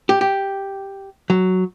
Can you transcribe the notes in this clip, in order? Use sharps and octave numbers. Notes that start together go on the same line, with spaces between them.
G4
G4
F#3